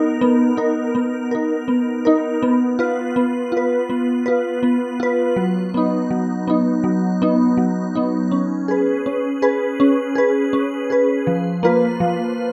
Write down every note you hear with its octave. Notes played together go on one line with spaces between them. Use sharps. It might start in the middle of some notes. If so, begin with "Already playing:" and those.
Already playing: B3 D#4 A#4
B3
D#4 A#4
B3
D#4 A#4
B3
D#4 A#4
B3
F4 B4
B3
F4 B4
B3
F4 B4
B3
F4 B4
F#3
B3 D#4
F#3
B3 D#4
F#3
B3 D#4
F#3
B3 D#4
C#4
G#4 B4
C#4
G#4 B4
C#4
G#4 B4
C#4
G#4 B4
F3
A#3 F4 B4
F3